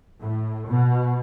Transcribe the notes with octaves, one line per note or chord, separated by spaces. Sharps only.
A2
B2